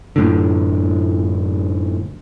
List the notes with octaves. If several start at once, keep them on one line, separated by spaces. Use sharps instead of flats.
F#2 A2 D3